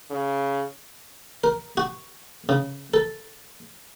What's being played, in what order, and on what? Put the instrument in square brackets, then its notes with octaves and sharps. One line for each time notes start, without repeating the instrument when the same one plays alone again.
[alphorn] C#3
[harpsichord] A#4
F#4
C#3
A4